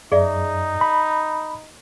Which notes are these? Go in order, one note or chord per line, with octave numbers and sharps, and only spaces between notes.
F#2 D#4 G#4 D5 E5
B5